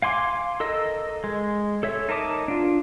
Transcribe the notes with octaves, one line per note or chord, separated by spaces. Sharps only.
F5 G#5 C6 D6
A4 A#4 D#5 E6
G#3
A4 C#5 E5
D#4 A#4 A5 D6 D#6
D4 F4